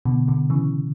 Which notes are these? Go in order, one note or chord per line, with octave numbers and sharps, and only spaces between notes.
B2 D3
B2 D3
C#3 E3